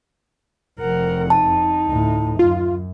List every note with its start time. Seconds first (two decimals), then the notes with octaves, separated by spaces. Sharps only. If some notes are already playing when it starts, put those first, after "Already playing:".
0.80 F1 F2 A#4 F#5
1.30 D#4 A5
1.88 D2 A2
2.39 F#2 F4